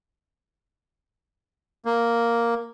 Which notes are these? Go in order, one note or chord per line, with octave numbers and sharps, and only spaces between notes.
A#3